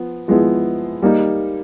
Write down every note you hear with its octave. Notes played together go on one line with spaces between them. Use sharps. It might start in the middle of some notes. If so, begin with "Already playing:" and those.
Already playing: F3 B3
F3 G#3 B3 E4
G3 A#3 D#4